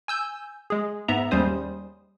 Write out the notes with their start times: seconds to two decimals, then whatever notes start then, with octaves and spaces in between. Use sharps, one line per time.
0.08 G#5 E6 G6
0.70 G#3 G#4
1.08 G#2 B3 E5 A#5
1.31 D#2 G3 G#3 C#4 C5 D#6